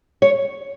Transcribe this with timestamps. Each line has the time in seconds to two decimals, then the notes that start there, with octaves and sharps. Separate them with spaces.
0.22 C#5